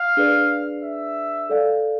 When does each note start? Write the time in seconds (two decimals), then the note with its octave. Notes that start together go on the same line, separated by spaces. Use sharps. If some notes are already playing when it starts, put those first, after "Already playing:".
Already playing: F5
0.17 D4 G#4 B4 D5
0.83 E5
1.50 A4 D5 F5